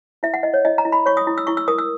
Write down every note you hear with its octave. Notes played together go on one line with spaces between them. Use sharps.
E4 E5
F#5
E4 D#5
C#5
E4 D#5
A#5
E4
B5
C#5 C#6
D#6
E4
E6
E4 C#6
E6
A#4 D#6
E6